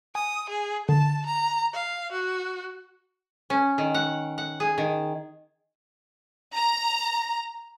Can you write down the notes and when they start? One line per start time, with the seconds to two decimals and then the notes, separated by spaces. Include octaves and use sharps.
0.15 G#5 D#6
0.50 G#4
0.89 D3 A5
1.26 A#5
1.73 F5
2.12 F#4
3.50 C#4
3.78 D#3
3.94 F#5
4.38 F#5
4.60 G#4
4.78 D#3
6.54 A#5